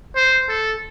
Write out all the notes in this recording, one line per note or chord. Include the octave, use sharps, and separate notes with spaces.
C5
A4